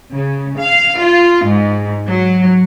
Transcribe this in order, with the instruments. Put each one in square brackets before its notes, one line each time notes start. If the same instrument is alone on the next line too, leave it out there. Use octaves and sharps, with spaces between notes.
[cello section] C#3
F5
F4
G#2
F#3